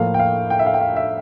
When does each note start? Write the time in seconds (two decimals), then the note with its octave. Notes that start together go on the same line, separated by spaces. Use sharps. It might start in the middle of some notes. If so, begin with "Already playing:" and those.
Already playing: A2 F3 A#3 F5
0.14 G5
0.19 F5
0.50 G5
0.59 E5
0.66 F5
0.74 G5
0.81 F5
0.96 E5